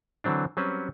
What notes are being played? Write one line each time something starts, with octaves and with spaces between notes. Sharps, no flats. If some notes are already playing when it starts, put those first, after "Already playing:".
D3 E3 F#3 C4 D4
F#3 G3 C4 C#4 F#4 B4